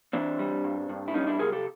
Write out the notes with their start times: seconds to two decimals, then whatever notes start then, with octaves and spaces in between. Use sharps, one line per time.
0.13 E3 C4 D4
0.39 G3
0.64 G2
0.89 G2
1.08 E4
1.14 G3 C#4 D#4
1.27 D4 E4
1.39 C3 G#4 A#4
1.52 G4 A4